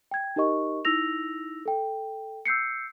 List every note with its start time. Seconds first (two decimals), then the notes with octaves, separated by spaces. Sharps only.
0.11 G5 G#6
0.36 D#4 G4 A#4 D#5 C#6
0.85 D#4 E4 E6 A#6 F7
1.66 A4 G5
2.46 E6 G6 C7 C#7